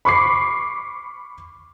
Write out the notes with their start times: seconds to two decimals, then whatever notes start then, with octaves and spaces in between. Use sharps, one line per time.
0.05 B5 C#6 D6 C7